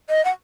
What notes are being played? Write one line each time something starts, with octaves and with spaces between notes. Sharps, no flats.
D#5
F#5